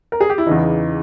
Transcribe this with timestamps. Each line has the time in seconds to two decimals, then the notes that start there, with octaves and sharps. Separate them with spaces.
0.12 A#4
0.20 G#4
0.30 G4
0.38 E4
0.46 E2 C#3 E3 D#4